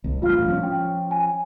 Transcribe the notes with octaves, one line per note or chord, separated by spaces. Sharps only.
C2
A1 G2 F4 F5 F6
F3 A#3 C#4
G5
G#5